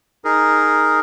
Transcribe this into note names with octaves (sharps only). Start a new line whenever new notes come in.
D#4 G#4 A#4